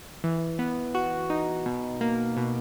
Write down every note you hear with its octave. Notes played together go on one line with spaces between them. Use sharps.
E3
B3
F#4
D#4
B2
A#3
B2